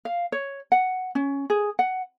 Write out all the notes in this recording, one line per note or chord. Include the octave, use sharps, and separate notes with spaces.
F5
C#5
F#5
C#4
G#4
F#5